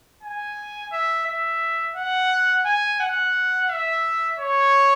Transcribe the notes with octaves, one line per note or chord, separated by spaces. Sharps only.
G#5
E5
E5
F#5
G#5
F#5
E5
C#5